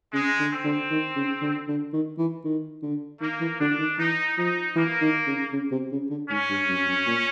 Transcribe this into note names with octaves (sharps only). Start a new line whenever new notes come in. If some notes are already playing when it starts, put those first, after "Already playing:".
C#3 G#3
D3
C4
D3
D#3
C#3
D3
D3
D#3
E3
D#3
D3
D#3 A#3
E3
D3 D4
D#3
E3 D#4
F3 D#4
E3 A#3
D#3
C#3
C#3
C3
C#3
D3
G#2 C#4
G2
F#2
F#2
A#2